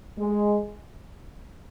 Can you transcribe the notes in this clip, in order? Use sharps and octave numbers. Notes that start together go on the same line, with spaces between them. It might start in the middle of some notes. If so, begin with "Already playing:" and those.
G#3